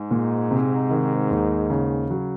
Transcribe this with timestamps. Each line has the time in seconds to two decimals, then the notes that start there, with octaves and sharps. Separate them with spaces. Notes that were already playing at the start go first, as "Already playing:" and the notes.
Already playing: G#2
0.11 A#2
0.51 C3
0.91 D#3
1.30 D#2
1.70 C#3
2.10 F#3